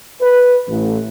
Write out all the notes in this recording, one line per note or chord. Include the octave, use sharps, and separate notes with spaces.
B4
A1